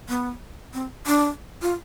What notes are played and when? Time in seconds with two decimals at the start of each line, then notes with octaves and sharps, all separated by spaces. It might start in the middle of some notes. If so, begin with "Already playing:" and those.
0.09 B3
0.74 C4
1.07 D4
1.62 F4